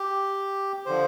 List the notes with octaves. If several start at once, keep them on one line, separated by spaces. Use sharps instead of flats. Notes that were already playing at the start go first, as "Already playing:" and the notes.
Already playing: G4
D3 F3 C5